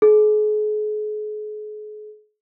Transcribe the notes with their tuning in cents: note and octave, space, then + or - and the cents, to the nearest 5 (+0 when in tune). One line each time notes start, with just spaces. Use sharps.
G#4 +40